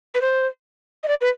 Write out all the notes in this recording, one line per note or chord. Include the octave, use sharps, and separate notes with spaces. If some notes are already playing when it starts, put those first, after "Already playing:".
B4
C5
D#5
D5
B4